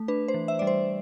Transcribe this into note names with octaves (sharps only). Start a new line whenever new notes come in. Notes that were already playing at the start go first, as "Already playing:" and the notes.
Already playing: A3
D4 B4
C5
E3
E5
G3 D5
C5